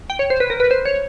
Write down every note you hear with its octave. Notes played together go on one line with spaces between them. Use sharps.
G5
C#5
C5
B4
A#4
B4
C5
C#5